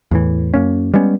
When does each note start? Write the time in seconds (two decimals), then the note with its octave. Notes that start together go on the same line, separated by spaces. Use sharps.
0.11 E2 A2 E3
0.54 F#2 A#3 C#4
0.94 G3 G#3 B3 C#4